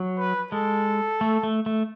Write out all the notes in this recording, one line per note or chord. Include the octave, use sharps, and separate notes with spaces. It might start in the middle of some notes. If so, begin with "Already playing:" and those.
Already playing: F#3
B4
G#3 A4
A3
A3
A3